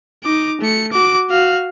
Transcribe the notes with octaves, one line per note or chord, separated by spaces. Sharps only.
D#4 D6
A3 C#7
F#4 D6
F#4 F5